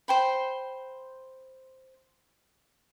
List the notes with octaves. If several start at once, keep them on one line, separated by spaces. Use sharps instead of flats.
C5 G5 B5